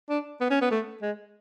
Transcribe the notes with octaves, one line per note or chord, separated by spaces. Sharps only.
D4
B3
C#4
B3
A3
G#3